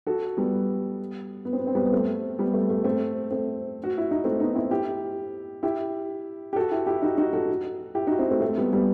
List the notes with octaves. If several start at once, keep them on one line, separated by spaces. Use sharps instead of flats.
F#4 A4
G3 B3
B3
C4
B3
C4
G3 B3
B3
A3 C4
G3 B3
A3
A3
A3 C4
A3 C4
F#4
E4
D#4
A3 C4
B3 D#4
C4 E4
E4 G4
E4 G4
G4
F#4 A4
E4 G4
E4 G4
D#4 F#4
D#4 F#4
F#4 A4
E4 G4
D#4 F#4
C4 E4
A3 C4
A3 C4
G3 B3
G3 B3